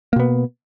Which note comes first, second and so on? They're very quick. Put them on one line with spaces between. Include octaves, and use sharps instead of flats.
A#3 B2 B3